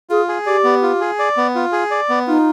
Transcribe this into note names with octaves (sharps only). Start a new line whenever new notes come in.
F4 G#4
G#4
G4 D5
B3
F4
G#4
D5
B3
F4
G#4
D5
B3
D#4 F4